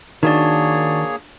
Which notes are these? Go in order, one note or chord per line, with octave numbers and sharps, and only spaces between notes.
D#3 A#3 D4 F#4 G#4 C#5 D5